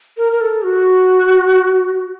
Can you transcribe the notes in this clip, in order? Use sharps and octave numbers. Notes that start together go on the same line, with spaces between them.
A#4
A#4
A4
F#4